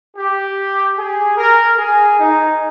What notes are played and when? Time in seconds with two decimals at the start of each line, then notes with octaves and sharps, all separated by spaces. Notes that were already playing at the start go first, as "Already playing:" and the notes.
0.16 G4
0.97 G#4
1.37 A#4
1.78 G#4
2.18 D#4